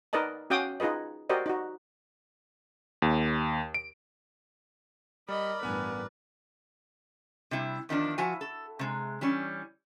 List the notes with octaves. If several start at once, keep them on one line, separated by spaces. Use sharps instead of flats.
D#4 A#4 B4 D5 D#5 A5
C#4 F#4 F5 G5 D6 D#6
D#4 F4 G#4 B4 D#5
F#4 G4 A#4 C5 D5 D#5
D#4 F#4
D#2
D7
G3 A#4 D5 D#5 B5
A1 G2 B3 B4 G#5
C3 G3 E4
E2 D#3 F3 D4
F3 E4 F#4 G#5
A4
C3 G#3
E3 G3 C#4